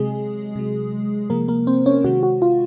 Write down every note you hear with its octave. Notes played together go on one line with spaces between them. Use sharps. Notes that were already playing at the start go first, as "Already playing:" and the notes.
Already playing: C3 F#3 G#3 G#4
C3 F#3
C3 F3 G#3 A#3 A#4
A#3 A#4
C4 C5
C#4 C#5
C3 D#3 G#3 F#4
F#4
F4